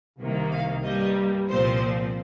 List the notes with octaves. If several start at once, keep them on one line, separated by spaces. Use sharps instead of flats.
C2 C3 D#3 A#3
F5
G2 G3 A#3 D#5
C2 A#2 F3 C4 C5